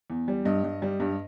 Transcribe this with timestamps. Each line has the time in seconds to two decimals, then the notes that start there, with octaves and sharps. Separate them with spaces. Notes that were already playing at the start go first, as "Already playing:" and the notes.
0.10 E2
0.28 G3
0.45 G2 D#5
0.64 G2
0.82 G3
1.00 G2